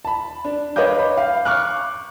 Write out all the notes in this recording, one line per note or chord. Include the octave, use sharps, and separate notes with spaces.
A5 B5
D4
B4 C#5 D#5 F5 D6 G6
B5
F5
C#6 D6 F6 F#6